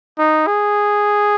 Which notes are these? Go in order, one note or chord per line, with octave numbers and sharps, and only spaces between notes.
D#4
G#4